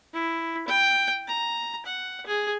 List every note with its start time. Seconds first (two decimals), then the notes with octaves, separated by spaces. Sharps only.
0.14 E4
0.68 G5
1.27 A#5
1.85 F#5
2.26 G#4